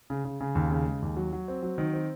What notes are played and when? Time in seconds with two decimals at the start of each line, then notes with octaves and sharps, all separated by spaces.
0.10 C#3
0.25 C#3
0.40 C#3
0.55 D#2
0.71 C#3
0.86 G#3
1.02 D#2
1.17 F#3
1.33 F#3
1.48 C4
1.63 F#3
1.78 D#3
1.93 C4